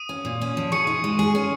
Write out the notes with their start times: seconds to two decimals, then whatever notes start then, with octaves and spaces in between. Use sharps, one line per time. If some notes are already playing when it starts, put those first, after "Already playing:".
Already playing: D#6 D#7
0.09 C#4
0.25 A#2
0.41 C#4
0.57 F3
0.72 G#4 C#6 C#7
0.87 D#4
1.04 G#3
1.19 G#4
1.35 C#4